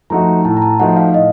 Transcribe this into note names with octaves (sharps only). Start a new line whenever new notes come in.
F3 A3 D#4 F#4 A#5
A2 A5
A#5
A5
F3 A3 D#4 F#4 F#5
F5
A2 D#5